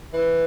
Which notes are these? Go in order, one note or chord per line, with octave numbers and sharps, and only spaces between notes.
E3